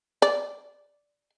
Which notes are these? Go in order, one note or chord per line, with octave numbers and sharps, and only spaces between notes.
D5